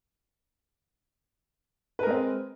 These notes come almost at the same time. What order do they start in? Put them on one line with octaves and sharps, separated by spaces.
B4 A#4 G#3 C4